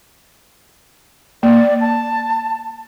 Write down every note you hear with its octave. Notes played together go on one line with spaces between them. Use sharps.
A#3 D5
A5